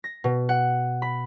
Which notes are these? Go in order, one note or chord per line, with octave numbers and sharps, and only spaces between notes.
A#6
B2
F#5
B5